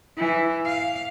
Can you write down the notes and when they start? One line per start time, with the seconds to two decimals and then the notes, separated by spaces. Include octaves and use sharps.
0.17 E3
0.65 F5